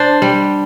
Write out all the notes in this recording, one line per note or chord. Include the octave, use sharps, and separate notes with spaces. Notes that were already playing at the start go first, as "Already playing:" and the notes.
Already playing: D4 C5 D5
G3